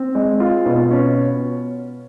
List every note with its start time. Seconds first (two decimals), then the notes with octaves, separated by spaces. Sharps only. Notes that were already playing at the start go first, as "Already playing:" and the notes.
Already playing: C4
0.15 G#3
0.40 F4
0.66 B2
0.91 C#4